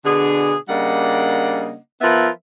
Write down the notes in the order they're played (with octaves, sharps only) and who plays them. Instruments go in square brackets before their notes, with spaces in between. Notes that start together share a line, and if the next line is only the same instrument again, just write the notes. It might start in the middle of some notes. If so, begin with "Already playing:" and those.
[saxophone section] B2 D3 D4 G#4
C#3 G3 A#3 D4 D#5 F#5
F3 B3 A#4 B4 E5